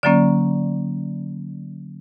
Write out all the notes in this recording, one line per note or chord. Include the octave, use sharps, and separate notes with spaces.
D3 F#3 A#3 C#4 D5